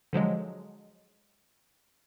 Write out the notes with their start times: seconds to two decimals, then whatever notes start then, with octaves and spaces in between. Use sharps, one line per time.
0.13 D3 F3 F#3 G#3